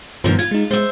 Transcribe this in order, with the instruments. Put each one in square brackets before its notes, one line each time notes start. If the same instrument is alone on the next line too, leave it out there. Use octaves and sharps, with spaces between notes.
[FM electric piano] G2 D#3 [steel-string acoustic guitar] B2 F3 A#4
[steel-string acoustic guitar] F4 [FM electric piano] G#6
[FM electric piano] G#3 D#4
[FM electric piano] G#3 [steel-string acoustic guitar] C5 E5